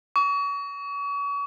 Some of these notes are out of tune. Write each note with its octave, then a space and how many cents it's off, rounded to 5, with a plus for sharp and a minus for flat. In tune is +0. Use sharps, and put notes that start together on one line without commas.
C#6 +35